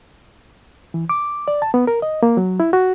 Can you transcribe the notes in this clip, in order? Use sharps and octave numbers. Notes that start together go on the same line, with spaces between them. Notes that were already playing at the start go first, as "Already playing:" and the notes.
E3
D6
D5
A5
B3
A#4
D#5
A#3
F#3
E4
F#4